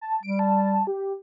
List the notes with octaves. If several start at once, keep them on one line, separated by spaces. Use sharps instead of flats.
A5
G3 D7
A5
G4